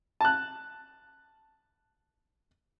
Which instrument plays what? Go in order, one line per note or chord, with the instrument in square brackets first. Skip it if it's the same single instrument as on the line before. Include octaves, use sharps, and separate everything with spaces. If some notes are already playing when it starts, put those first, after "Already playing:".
[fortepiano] A5 F#6